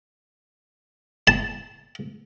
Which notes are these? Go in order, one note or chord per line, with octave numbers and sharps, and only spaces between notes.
A5